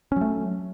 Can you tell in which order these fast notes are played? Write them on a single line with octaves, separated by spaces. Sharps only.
C#4 F#3 A3